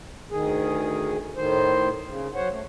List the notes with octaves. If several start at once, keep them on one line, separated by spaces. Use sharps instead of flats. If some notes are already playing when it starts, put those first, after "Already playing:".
D2 D#3 G#4
A2 D#3 C5
C#3
F#3 C5 C#5 F#5
A3